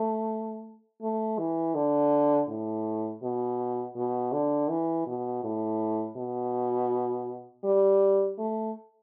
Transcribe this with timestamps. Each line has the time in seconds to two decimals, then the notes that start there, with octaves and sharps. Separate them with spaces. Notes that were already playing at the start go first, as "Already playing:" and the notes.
Already playing: A3
1.02 A3
1.38 E3
1.75 D3
2.49 A2
3.23 B2
3.96 B2
4.33 D3
4.69 E3
5.07 B2
5.44 A2
6.17 B2
7.64 G3
8.38 A3